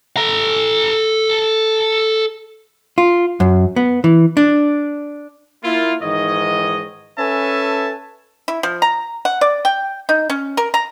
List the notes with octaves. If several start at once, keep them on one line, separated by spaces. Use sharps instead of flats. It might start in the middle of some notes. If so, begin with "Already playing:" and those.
A4 A#5
F4
F#2
B3
E3
D4
A#3 E4 F4
G#2 D#3 E3 C#5 D#5
C#4 A4 B4 E5 G#5 A5
E4
F3
A#5
F#5
D5
G5
D#4
C#4
A#4
A#5